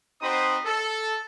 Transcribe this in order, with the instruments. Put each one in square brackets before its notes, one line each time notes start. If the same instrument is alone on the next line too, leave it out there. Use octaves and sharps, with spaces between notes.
[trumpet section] C4 D#4 F#4 C5 B5 D#6
A4